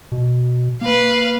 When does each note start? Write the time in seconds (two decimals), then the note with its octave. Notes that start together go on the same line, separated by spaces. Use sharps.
0.12 B2
0.81 A#3 B4 F5